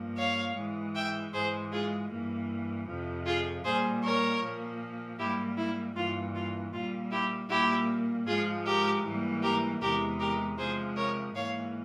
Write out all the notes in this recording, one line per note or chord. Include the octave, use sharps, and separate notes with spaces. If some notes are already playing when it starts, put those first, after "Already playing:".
Already playing: G2 F3 A#3
C#5 F5
G#2 E3 G#3
E5 G5
G#2 E3 G#3 G#4 C5
F4 G#4
G2 E3 A#3
F2 C3 F3
F4 G#4
A#2 G3 A#3 G#4 C5
A#4 C#5
A#2 F3 A#3
G#2 G3 A#3 E4 G4
E4
G2 E3 A#3 F4
F4
A#2 G3 A#3 F4
E4 G4
A#2 G3 A#3 E4 G4
G#2 F3 G#3 F4 G#4
G4 A#4
G#2 E3 G3 A#3
G4 A#4
E2 C3 E3 G#3 G4 A#4
G4 A#4
C3 F3 G#3 G#4 C5
A#4 C#5
G#2 E3 A#3 C#5 F5